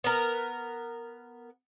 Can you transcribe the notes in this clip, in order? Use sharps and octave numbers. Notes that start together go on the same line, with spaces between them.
B3 A#4